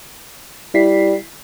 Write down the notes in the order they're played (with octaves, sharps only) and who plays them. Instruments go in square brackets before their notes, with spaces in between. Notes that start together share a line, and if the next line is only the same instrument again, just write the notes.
[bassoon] G3 [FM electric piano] E4 B6 C7